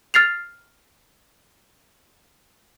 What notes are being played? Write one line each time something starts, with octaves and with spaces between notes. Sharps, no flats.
F6 A6 C7 F7